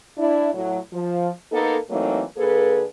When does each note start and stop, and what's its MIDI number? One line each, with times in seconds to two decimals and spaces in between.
0.18 0.49 62
0.18 0.49 64
0.54 0.78 45
0.54 0.78 54
0.93 1.29 53
1.52 1.76 58
1.52 1.76 59
1.52 1.76 63
1.52 1.76 69
1.90 2.22 52
1.90 2.22 54
1.90 2.22 57
1.90 2.22 58
1.90 2.22 60
1.90 2.22 63
2.38 2.84 50
2.38 2.84 58
2.38 2.84 68
2.38 2.84 69
2.38 2.84 71